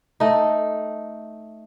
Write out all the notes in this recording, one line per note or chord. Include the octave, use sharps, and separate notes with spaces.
A3 D#4